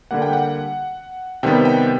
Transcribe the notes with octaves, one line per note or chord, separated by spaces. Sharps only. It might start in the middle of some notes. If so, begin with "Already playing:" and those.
D3 G3 A#3 F#5
G5
F#5
C3 D#3 G3 B3 G5
G5